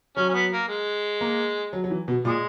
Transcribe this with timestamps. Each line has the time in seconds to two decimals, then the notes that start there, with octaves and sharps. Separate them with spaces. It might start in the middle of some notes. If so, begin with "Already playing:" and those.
0.16 F#3 C#4
0.29 C#4
0.34 B3
0.51 A#3
0.68 G#3
1.21 A#3
1.73 F#3
1.84 F#3
1.91 E3
2.08 B2
2.25 A#2 G#3